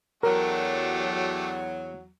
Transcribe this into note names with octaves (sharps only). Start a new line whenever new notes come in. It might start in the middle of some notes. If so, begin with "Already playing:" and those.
E2 F#3 A3 D4 G4 A#4